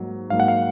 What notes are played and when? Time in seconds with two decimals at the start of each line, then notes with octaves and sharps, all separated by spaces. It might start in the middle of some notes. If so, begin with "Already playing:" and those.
Already playing: G#2 F#3 A#3
0.30 G#2 F#3 A#3 F5
0.40 F#5
0.48 F5